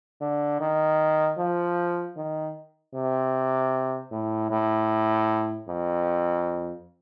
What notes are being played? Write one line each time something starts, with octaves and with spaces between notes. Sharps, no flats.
D3
D#3
F3
D#3
C3
A2
A2
F2